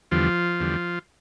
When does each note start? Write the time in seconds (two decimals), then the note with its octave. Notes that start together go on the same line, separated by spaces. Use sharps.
0.11 E2 D3 F3 G3 F4
0.60 E2 D3 G3